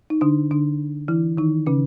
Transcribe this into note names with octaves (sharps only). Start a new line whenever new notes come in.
D#4
D3 D4
D3 D4
E3 E4
D#3 D#4
C#3 C#4